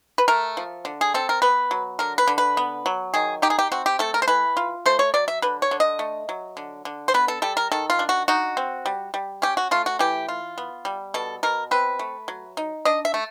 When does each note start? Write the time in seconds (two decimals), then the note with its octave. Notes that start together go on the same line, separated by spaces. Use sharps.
0.18 B4
0.28 A3 A#4
0.57 F3
0.85 D3
1.01 G#4
1.14 C4 A4
1.29 A#4
1.42 B3 B4
1.71 F#3
1.99 D3 A#4
2.18 B4
2.28 D3
2.38 B4
2.57 B3
2.86 F#3
3.14 D#3 G#4
3.42 D#4 G4
3.50 G#4
3.59 G4
3.72 C4 F#4
3.86 G4
3.99 A3 A4
4.14 A#4
4.22 C5
4.28 E3 B4
4.57 F4
4.86 A3 C5
4.99 C#5
5.14 F#3 D5
5.28 E5
5.42 D3 B4
5.62 C#5
5.71 D3
5.80 D#5
5.99 A3
6.29 F#3
6.57 D3
6.85 D3
7.08 C5
7.14 B3 B4
7.28 A4
7.42 G3 A4
7.57 A#4
7.72 D#3 A4
7.90 F4
7.99 D4
8.09 F#4
8.28 D#4 F#4
8.57 C4
8.86 G3
9.14 G3
9.42 C#4 G4
9.57 F#4
9.71 A3 F4
9.86 F#4
9.99 E3 G4
10.28 F4
10.58 B3
10.85 G3
11.14 B2 A4
11.43 B2 A#4
11.71 C4 B4
11.99 A3
12.28 F#3
12.57 D#4
12.85 D4 D#5
13.05 E5
13.14 A3